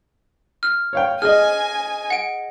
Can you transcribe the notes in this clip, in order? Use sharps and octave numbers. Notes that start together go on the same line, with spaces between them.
F6
C#5 F5 G5
G#4 D#5 G#5 F6
F#5 D7